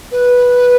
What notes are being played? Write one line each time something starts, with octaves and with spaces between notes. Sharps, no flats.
B4